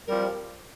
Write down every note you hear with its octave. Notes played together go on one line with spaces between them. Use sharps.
F3 G3 C4 G4 A#4